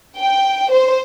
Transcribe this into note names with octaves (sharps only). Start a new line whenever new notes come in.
G5
C5